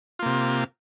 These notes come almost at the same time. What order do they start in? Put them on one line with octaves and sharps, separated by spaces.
F4 A#3 C3